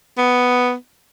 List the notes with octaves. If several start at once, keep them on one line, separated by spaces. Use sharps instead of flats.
B3